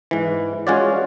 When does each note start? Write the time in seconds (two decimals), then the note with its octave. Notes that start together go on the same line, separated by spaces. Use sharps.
0.11 G#2 E3
0.67 G#3 C#4 F4 F#4 C#5 D5